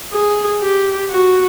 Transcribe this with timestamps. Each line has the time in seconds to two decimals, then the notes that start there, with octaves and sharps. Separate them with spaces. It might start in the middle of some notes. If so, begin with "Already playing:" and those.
0.13 G#4
0.61 G4
1.10 F#4